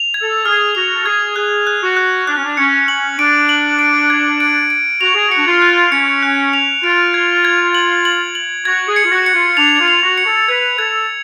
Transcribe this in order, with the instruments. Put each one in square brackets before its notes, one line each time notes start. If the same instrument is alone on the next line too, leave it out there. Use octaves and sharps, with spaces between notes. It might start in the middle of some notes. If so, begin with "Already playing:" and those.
Already playing: [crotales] F7
G#6
[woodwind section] A4
[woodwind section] G#4 [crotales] F6
[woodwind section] F#4 [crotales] F7
[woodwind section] A4
[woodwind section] G#4 [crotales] G#6
[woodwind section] G#4 [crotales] F#6
[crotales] F#6
[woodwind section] F#4
[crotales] F#6
[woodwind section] D4 [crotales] F#6
[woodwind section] C#4
D4
[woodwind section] C#4 [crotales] C#7
[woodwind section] C#4 [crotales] F#7
[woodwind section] D4 [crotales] D7
[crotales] F#7
D7
G#6
D7
D7
[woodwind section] F#4 [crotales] F7
[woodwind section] G#4
[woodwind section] F#4 [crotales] C#7
[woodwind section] D4
F4
[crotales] F#6
[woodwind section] C#4 [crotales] C#7
[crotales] F#6
F7
[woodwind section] F4 [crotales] D7
[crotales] G#6
G#6
F#7
F#7
F#7
[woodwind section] F#4 [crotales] G#6
[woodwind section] G#4
[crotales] C#7
[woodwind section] F4
F#4
[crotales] C#7
[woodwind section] F4
[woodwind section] D4 [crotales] F7
[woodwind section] F4
[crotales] F7
[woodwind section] F#4
[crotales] C#7
[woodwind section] A4
[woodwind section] B4 [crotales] G#6
[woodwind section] A4 [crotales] G#6